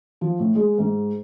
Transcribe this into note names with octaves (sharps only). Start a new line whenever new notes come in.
F3
A2
G#3
G#2